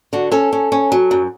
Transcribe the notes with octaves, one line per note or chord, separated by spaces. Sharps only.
D3 F#4
C#4 A4
C#4
C#4
F#3
F#2